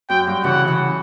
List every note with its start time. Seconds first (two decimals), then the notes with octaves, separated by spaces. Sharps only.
0.10 F#2 G5
0.27 G2
0.44 C#3 E3 F#5
0.67 C#3 E3